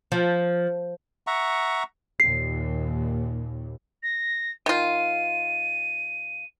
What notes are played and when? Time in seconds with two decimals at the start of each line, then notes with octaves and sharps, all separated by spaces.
0.12 F3
1.27 E5 F#5 A#5 C#6
2.20 D#2 A#2 C7
4.03 A#6
4.66 D#3 F4 D#7